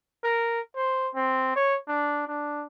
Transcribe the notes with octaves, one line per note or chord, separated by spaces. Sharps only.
A#4
C5
C4
C#5
D4
D4